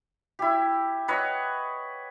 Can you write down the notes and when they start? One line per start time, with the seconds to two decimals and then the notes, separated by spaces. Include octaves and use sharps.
0.39 E4 G4
1.08 B4 C#5 D#5 F#5